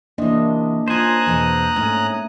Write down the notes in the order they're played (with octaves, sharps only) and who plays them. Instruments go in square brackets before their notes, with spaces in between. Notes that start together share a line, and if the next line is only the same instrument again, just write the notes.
[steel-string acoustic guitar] C3 E3 [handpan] A#3 D4 D#5
[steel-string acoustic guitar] C#4 F4 [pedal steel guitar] C5 G#5 [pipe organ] A#5 D#6 F#6
[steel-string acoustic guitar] E2 B2 C4
[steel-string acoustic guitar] G#2 [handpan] A3 [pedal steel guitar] C#4